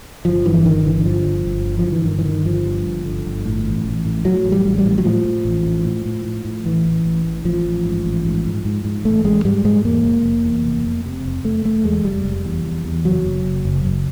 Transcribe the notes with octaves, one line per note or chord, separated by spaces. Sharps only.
G1 F3
G2 E3
G1 D#3
D3 E3
G2 F3
G1
G1
D3
F3
G1
E3
G2 D#3
E3
D3 D#3
G1 F3
G2
G1
D3
G1
A2
A1
A1
A2
A2 F#3
A1
G3
A1
G3
A2
F#3
A2 F3
A2
A1
A2
A2
A2
A2
A2
A1 E3
A1
A1
A1
A1 F3
A1
G#2
A1
G#2
G#2
G#2
G#2
A1 A3
A1 G#3
G#2 G3
G#2 G#3
E2 A#3
F1
F1
E2
F1
F1
C3
F1
F1 A3
F1 A3
E2 G#3
F1 G3
F1
E2
E2
E2
F#1 F#3
F#1
F#1
F#1
F#1